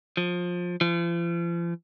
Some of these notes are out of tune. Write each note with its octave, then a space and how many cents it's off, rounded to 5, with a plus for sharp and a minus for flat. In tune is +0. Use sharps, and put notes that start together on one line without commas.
F3 +20
F3 -40